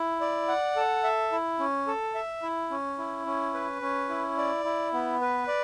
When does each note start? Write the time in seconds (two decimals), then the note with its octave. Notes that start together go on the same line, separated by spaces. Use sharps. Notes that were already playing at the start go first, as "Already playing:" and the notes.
Already playing: E4
0.21 D5
0.48 F#5
0.76 A4
1.04 E5
1.32 E4
1.59 C#4
1.87 A4
2.15 E5
2.43 E4
2.71 C#4
2.98 E4
3.26 C#4
3.54 B4
3.82 C#4
4.09 E4
4.37 D5
4.65 E4
4.93 B3
5.21 B4
5.48 D5